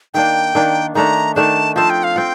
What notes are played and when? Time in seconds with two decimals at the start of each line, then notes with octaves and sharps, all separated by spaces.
0.14 D#3 A#3 D4 G5
0.55 D#3 A#3 D4
0.95 D#3 A3 D4 A#5
1.35 D#3 A3 D4 A5
1.76 F3 C4 F4 A5
1.90 G5
2.04 F5
2.16 C4 F4 G5